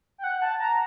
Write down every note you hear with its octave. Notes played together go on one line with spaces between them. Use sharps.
G5
F#5
A5
A#5